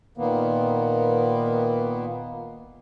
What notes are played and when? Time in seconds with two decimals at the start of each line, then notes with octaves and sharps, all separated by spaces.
0.17 A#2 D#3 A#3 B3